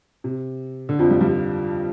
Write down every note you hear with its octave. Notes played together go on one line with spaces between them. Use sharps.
C3
D3
F2 F3
G2 G3
G2 G3